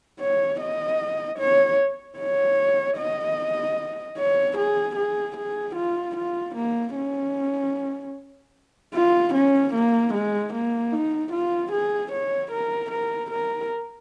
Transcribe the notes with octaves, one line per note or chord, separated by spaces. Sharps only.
C#5
D#5
C#5
C#5
D#5
C#5
G#4
G#4
G#4
F4
F4
A#3
C#4
F4
C#4
A#3
G#3
A#3
D#4
F4
G#4
C#5
A#4
A#4
A#4